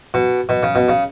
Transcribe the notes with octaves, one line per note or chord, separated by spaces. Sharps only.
B2
B2
C#3
B2
C#3